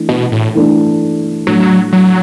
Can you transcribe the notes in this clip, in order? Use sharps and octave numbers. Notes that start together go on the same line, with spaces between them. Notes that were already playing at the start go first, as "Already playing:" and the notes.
Already playing: E3 A3 D4
B2
A2
E3 A3 D4
A2 F#3 A3 D4
F#3